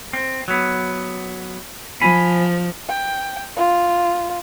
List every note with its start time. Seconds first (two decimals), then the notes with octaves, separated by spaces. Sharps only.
0.13 C4
0.48 F#3 B3
2.01 F3 G#5 B5
2.88 G5
3.56 F4